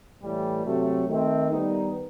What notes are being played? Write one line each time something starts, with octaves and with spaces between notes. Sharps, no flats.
A2 E3 G3
C3 F#3 A3
D#3 A3 C4
D#3 G3 B3 D#4